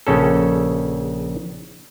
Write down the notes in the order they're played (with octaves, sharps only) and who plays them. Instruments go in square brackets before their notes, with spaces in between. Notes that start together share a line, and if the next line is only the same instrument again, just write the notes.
[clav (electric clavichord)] A#1 C#3 C#4 A4